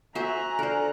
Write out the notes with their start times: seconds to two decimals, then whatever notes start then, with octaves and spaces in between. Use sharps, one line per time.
0.15 F#4 C5 E5 G#5 A#5 F#6
0.59 D3 A#4 C5